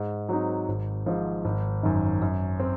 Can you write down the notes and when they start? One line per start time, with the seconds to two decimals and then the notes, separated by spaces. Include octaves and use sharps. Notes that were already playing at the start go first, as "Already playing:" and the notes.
Already playing: G#2
0.29 F#3 C4 D#4
0.68 G#1
1.06 G#2 F3
1.45 G#1
1.83 F#2 D#3
2.22 F#2
2.60 C4